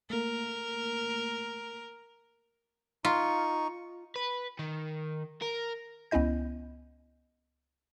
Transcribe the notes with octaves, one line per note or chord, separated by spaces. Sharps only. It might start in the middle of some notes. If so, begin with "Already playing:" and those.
A3 A#3 A#4
D#4 F4 C#6
B4
D#3
A#4
C#2 B3 C#4 E4 D#5 G6